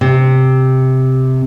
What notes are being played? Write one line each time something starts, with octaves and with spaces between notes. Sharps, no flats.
C3